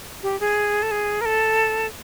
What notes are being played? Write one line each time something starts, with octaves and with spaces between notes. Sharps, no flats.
G4
G#4
A4
G#4
A#4
A4